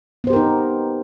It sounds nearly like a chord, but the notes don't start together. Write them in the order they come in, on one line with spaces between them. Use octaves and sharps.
B3 C5 G4 A#4 D#4